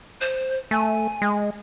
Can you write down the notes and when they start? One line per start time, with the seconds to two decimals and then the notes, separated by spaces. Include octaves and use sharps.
0.21 C5
0.71 A3 G#5
1.22 G#3